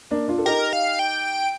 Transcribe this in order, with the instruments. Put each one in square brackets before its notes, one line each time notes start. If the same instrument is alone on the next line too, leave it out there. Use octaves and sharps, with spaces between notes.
[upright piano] A#3 D4
D4 F4
A4
[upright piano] D#4 G4 [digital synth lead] A#4
[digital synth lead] F5
G5